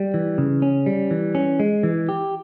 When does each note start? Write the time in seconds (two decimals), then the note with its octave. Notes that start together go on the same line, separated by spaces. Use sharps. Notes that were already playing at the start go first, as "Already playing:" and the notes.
Already playing: G3
0.14 E3
0.38 C#3
0.62 C#4
0.86 G3
1.11 E3
1.35 C#4
1.60 G#3
1.83 E3
2.09 G4